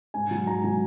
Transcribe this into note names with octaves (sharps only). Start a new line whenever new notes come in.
G#2 G#5
F#3
G#2 A#5
F#3 G#5